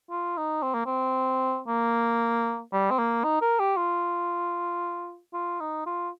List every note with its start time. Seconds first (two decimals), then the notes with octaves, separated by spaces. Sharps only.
0.10 F4
0.37 D#4
0.63 C4
0.74 A#3
0.86 C4
1.67 A#3
2.73 G3
2.91 C4
2.99 A#3
3.24 D#4
3.42 A#4
3.59 G4
3.77 F4
5.34 F4
5.60 D#4
5.86 F4